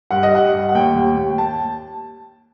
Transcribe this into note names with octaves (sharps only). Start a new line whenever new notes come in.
G2 F#5
D#5
G3 F#5
G2
F#5
D#2 G5
D#2
D#2
G5
A5